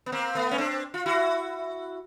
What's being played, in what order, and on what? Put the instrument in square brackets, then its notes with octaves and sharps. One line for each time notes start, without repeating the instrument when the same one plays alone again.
[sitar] B3
A#3 C4
A3 B3
C#4
C4 D4
F4
E4 F#4